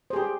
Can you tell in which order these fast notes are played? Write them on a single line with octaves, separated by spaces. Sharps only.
C5 G#4 G4